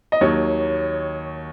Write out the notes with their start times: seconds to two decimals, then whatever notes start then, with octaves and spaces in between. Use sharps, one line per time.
0.12 D#5
0.21 D#2 D#3 F#3 C#5